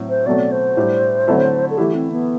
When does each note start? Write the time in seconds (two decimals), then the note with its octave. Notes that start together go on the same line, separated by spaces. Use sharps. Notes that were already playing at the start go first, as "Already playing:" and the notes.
Already playing: A2 F#3 C4
0.09 C5
0.26 B2 F#3 A3 C4 D5
0.52 C5
0.77 A2 G3 D4
1.27 D3 F#3 A3 C4 E4
1.70 A4
1.78 E3 A3 E4 G4
1.94 C4
2.12 B3